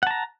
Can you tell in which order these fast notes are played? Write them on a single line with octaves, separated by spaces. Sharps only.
F#5 A5 A#5